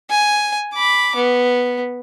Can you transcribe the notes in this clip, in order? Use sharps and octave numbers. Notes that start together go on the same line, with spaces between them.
G#5
B5 D6
B3